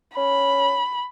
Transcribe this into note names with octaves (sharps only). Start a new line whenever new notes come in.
C#4 B5